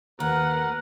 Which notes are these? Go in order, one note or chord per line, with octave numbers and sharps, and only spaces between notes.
D#2 A#4 B4 F#5